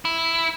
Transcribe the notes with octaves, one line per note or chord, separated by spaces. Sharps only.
E4